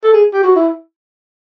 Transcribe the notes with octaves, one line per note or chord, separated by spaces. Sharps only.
A4
G#4
G4
F#4
E4